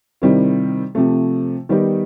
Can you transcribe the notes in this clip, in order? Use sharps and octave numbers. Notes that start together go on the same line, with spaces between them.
C3 D#3 G3 C4 E4
C3 F3 A3
D#3 G3 B3 D#4 G4